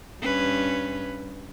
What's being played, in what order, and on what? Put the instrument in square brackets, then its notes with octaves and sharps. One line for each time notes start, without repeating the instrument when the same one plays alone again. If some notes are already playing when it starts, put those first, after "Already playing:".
[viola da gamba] G2 C#4 B4